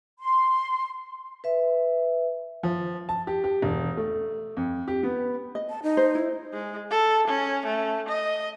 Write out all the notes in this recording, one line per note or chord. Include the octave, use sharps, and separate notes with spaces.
C6
B4 E5
F3
A5
G4
G4
E1
A3
F2
G4
B3
D#5
A5
D#4
C5
E4
G#3
A4
C#4
A3
D#5